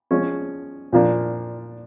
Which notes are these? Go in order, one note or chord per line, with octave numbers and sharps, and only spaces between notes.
F3 G#3 C#4
A#2 F3 A#3 D4